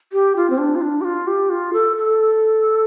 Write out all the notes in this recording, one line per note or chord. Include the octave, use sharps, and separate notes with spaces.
G4
F4
C4
D4
F4
D4
G4
F4
G4
F4
A4
A4